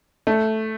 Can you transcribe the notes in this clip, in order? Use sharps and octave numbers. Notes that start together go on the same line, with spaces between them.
A3